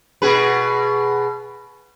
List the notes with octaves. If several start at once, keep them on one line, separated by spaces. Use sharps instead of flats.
B2 G#4 B4